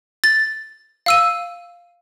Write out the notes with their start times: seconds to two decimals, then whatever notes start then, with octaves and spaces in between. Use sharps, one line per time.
0.24 A6
1.06 F5 E6 D#7